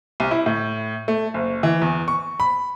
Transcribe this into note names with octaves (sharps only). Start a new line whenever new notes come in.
C2
E4
A2
A3
F#1
E3
E2
C#6
B5